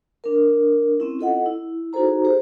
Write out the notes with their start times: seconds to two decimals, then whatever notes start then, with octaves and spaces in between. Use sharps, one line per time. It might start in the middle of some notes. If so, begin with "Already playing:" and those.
0.24 D4 A#4
1.00 C4 C#4 E4
1.19 F4 A4 D#5 F#5
1.46 E4
1.93 D#4 F#4 G#4 A4 C5 A#5
2.25 G4 G#4 C5